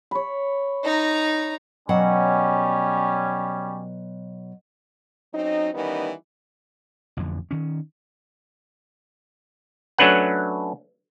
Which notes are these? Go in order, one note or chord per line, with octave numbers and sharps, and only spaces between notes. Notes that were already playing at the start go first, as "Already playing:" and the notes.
C#5 B5
D#4 A#5
B2 F#3 G3 C#4 F#5
F#3 C4 C#4 D#4
D#3 E3 G3 B3 C#4 D#4
A1 F2 D3
D#3 C#4
F#3 A3 C#4 D4 B4 F#5